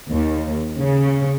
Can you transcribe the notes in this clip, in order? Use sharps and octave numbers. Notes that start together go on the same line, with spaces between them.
D#2
C#3